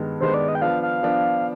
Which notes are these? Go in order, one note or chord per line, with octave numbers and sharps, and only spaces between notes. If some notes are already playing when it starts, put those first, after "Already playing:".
Already playing: G2 D#3 G#3 B3
G2 D#3 G#3 B3 C5
D5
D#5
G5
F3 B3 D4 F5
F5
F3 B3 D4